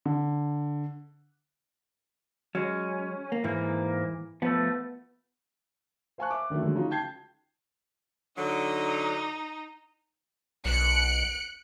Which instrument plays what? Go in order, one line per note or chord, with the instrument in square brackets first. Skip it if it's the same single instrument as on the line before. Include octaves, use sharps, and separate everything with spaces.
[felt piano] D3
[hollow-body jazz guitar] F#3 G#3 [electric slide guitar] C#4
[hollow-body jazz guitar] A#3
[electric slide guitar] G#2 A#3 [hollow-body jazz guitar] E3
[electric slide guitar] F3 A3 [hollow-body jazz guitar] B3
[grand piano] C5 F5 G#5 A5 C#6 F#6
E5 D6
D3 D#3 F#3 A3
D3 F#3 G#3
C#3 F#3 D#4 F4
G5 A5 G6 G#6 C7
[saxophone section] D3 F#3 [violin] D#4
[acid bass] B1 [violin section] F#6 C#7 D7